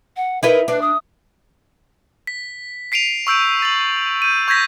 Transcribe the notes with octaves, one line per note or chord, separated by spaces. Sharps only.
F#5
D#4 E4 A#4 B4
D4 B4
D#6
B6
B6 C7 D7 D#7 F7
C#6 E6 G6 D7
A6 F#7
G6 D#7
C#6 G6 G#6 A#6 B6